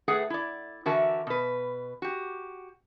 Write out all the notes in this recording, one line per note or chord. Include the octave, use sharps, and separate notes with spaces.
A2 A3 G#4 B4 F#5
E4 D5
D3 E3 F#4 A#4 E5 A5
B2 B4
F#4 G4